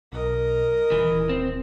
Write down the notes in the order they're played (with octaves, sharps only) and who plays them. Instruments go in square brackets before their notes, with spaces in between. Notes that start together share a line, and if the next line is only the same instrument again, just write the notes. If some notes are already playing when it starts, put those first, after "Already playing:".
[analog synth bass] B1 [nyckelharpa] A#4 D#5
[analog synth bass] D#1 [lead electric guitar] E3
[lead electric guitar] C4